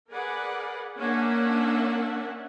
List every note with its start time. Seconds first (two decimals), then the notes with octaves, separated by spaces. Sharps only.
0.11 G#4 A#4 B4 D5 F#5
0.98 A#3 C#4 D4 A#4 E5 F#5